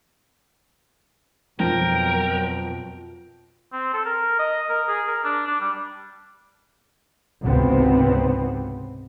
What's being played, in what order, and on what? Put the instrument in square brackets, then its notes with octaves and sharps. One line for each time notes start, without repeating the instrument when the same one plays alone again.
[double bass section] F2 B2 F#3 [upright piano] F3 [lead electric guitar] A#4 [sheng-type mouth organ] G5
[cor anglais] C4
A4
A#4
D#5
A#4
G#4
A#4
D4
D4
G3
[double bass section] G#1 C#2 C3 B3 C4